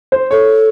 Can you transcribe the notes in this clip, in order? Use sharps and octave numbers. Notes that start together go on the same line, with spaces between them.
C5
A4 C#5